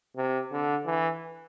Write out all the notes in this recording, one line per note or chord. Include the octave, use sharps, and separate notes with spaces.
C3
D3
E3